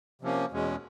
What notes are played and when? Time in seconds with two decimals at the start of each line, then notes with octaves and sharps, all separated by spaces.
0.22 C3 F3 A#3 C#4
0.52 E2 B2 G#3 C#4